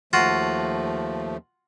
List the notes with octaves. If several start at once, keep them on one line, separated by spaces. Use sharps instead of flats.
D#2 F3 A3 F4 F#4